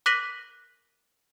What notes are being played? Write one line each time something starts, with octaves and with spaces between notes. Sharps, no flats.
D6 F#6 A#6 B6 D#7 F#7